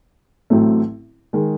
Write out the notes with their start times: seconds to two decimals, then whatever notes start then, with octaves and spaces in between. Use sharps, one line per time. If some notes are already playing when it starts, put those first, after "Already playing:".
0.50 A1 A2 F#3 A3 C4
1.33 D#3 G#3